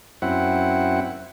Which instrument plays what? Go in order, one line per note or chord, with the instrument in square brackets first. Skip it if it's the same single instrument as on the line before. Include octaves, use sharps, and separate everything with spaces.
[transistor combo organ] F#2 C4 E4 F#5